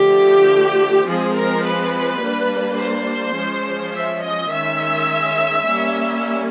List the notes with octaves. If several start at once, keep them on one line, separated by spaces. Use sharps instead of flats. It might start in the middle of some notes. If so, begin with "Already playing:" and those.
Already playing: D3 F3 A3 G4
F3 G#3 C4 G#4
A#4
B4
G3 A#3 D4
C5
F3 G#3 C#4
E5
D#5
D#3 G#3 C#4 E5
G3 A#3 C#4